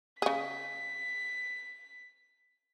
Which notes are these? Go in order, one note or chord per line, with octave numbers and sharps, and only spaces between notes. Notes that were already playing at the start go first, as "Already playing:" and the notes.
C#3 G#4 B6